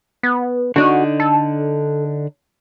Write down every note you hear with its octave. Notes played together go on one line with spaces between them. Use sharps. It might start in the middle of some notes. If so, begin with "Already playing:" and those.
B3
D3 D4 D#4 F#4
A4